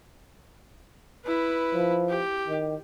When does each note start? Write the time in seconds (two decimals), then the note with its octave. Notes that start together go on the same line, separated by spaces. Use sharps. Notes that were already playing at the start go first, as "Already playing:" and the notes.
1.25 E4 B4
1.75 F3
2.09 G4
2.47 D#3